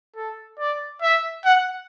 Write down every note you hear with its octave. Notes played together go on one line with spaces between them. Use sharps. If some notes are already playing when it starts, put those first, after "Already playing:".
A4
D5
E5
F#5